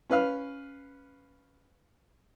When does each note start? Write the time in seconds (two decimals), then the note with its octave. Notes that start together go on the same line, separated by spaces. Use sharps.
0.10 C#4 B4 F5 F6